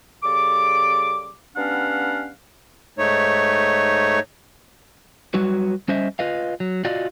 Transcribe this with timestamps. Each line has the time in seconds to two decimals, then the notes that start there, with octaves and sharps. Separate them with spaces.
0.23 C#3 G3 A4 D6
1.56 G3 B3 C#4 D4 F5 F#5
2.98 G#2 A3 D#4 C#5
5.34 F#3 G3 F#4 B4
5.88 G3 C#4 C5 D#5 E5
6.19 F4 B4 D#5 F5
6.60 F#3
6.85 F4 F#4 D5 D#5 F5